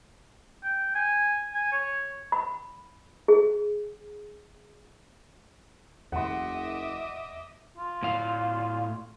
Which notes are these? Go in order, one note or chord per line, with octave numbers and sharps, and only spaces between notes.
G5
G#5
G#5
C#5
B5
G#4
F#1 E2 D#5 E5 F#5 C6 D6
F4
A2 F5